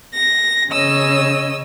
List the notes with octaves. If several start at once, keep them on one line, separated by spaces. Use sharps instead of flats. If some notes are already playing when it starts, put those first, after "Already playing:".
A#6
C#3 C#5 D#5 E6